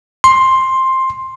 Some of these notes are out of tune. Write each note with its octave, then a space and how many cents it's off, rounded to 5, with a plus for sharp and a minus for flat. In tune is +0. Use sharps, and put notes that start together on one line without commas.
C6 +10